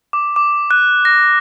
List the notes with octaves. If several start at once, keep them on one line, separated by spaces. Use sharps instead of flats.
D6
D6
F#6
A#6